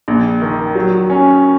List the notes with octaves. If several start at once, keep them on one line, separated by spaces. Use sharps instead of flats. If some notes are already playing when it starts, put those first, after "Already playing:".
A#1
D#3
F#3
C#4